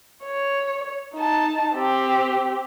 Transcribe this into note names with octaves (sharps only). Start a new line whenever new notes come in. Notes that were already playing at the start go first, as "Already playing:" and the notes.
C#5
D#4 A5
C4 G4